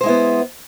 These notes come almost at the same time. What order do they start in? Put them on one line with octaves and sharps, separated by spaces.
C5 G#3 E4 B3